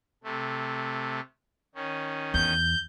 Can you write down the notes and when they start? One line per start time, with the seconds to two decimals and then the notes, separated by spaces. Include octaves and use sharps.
0.24 C3 A3
1.75 D#3 C#4
2.34 E2 G6